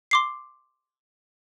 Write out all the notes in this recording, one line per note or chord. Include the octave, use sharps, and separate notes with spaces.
C6 D6 C7